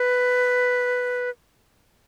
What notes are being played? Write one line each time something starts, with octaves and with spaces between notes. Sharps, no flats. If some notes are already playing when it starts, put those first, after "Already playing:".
Already playing: B4